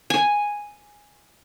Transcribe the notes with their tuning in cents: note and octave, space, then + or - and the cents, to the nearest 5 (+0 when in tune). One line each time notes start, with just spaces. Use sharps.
G#5 -5